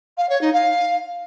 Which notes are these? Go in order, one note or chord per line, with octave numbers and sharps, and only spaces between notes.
F5
C#5
D#4
F5